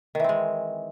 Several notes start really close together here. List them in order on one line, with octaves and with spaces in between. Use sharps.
D#3 E3 C4 G#3